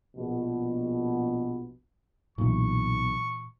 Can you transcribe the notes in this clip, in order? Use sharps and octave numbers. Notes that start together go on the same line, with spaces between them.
A#1 B2
B1 A#2 E3 C#6